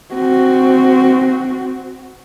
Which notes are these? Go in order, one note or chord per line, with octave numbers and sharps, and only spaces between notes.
C4 F#4